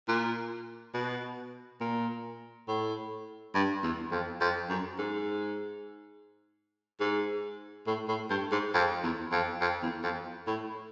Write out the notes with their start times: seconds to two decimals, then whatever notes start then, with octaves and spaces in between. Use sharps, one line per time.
0.08 A#2
0.94 B2
1.80 A#2
2.68 A2
3.54 G2
3.83 E2
4.11 F2
4.41 F2
4.69 F#2
4.98 G#2
7.00 G#2
7.87 A2
8.08 A2
8.30 G2
8.51 G#2
8.74 F2
9.03 E2
9.32 F2
9.61 F2
9.82 E2
10.03 F2
10.47 A2